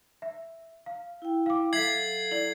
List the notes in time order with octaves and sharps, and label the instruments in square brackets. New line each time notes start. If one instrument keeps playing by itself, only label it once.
[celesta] E5
F5
[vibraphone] E4 G5
[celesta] F5 D6
[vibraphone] F#3 A4 [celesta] E5 F5 B6 [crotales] G#6 C7 F#7
[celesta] E4 D5 [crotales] F#7